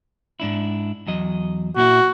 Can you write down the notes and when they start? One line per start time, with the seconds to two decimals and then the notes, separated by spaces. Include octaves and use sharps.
0.40 G#2 D4 E4
1.07 E2 F#3 D#5
1.76 A#2 A#3 E4 F#4